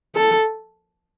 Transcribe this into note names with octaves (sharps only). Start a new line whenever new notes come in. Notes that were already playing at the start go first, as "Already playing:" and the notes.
A4